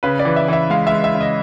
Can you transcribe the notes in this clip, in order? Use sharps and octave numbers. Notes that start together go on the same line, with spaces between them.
C#3 B4
D5
E3
E5
E3 E5
G#3 F5
G#3 E5
E5
C#3
D#5